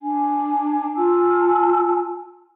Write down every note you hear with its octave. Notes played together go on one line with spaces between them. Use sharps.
D4 G#5
F4 G#5 A5 E6